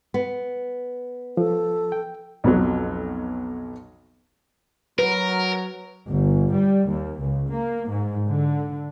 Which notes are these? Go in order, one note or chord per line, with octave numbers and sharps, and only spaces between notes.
B3
F3 A4
G5
B1 F2 F#3
F#3 A#4 B4
G1
G3
D#2
C#2
A#3
G#2
D3